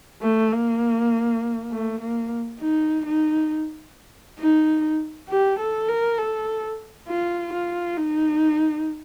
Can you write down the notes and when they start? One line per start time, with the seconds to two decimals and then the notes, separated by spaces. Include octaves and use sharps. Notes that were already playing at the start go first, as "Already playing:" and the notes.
0.22 A3
0.53 A#3
1.71 A3
2.01 A#3
2.60 D#4
3.06 D#4
4.39 D#4
5.29 G4
5.59 A4
5.89 A#4
6.18 A4
7.08 F4
7.53 F4
7.98 D#4